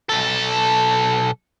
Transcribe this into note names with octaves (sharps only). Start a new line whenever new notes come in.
B1 A4